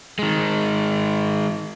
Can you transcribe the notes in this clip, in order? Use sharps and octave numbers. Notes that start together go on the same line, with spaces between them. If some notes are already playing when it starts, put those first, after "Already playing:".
D#3 G#3